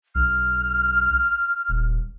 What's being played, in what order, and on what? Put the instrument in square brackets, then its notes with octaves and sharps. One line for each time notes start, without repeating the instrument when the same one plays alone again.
[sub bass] B1 [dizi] F6
[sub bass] D#1